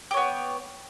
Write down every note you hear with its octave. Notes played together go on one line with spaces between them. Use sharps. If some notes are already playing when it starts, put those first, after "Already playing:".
B3 G4 C#5